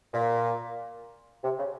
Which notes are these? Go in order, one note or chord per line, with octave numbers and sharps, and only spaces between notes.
A#2
C3
C#3